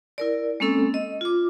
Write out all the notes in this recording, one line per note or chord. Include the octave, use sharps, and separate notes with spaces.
E4 A#4 D5
G#3 A#3 C4 C#4 A4 E6
D#5
F4 D6